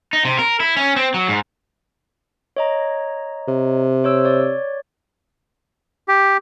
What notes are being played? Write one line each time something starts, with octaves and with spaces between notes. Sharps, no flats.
D#4
C3
A#4
E4
C#4
C4
F#3
G#2
C#5 D#5 A#5
C3
C5 C#5 E6
C#5 D5
G4